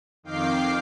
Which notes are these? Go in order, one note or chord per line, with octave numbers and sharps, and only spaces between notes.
F2 D#3 F5 G5 D6 C7